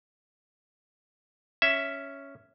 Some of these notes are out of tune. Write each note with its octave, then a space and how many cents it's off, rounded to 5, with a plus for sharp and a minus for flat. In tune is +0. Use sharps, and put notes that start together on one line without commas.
C#4 +0 E5 +0